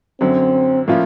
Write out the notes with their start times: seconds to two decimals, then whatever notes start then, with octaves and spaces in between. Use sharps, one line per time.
0.21 F#2 D3 F#3 C4
0.88 A2 F3 A#3 C#4 F4